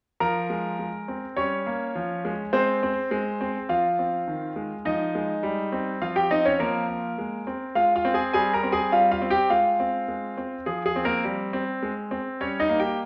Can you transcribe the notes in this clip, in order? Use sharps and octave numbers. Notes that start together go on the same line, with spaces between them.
F3 A#4 A#5
G#3
G#3
C4
G3 C#4 C#5
A#3
F3
G#3
G#3 C4 C5
C4
G#3
C4
F3 F4 F5
C4
D#3
G#3
F3 D#4 D#5
G#3
G3
C4
F3 F4 F5
G4 G5
C4 D#4 D#5
C#4 C#5
F3 A#3 A#4
A#3
G#3
C4
G#3 F4 F5
F4 F5
C4
G#4 G#5
G3 G#4 G#5
A#4 A#5
C4
G#4 G#5
G3 F4 F5
F4 F5
C4
G4 G5
G#3 F4 F5
C4
G#3
C4
F3 G#4
G#4
C4
A#3 A#4
G3
C4
G#3
C4
G3 C#4 C#5
D#4 D#5
A#3
G4 G5